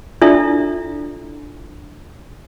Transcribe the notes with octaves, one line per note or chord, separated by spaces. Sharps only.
D4 E4 F4 A4 D5 E5